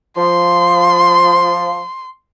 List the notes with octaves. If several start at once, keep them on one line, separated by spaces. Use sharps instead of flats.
F3 C6